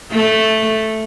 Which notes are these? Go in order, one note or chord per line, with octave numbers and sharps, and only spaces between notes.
A3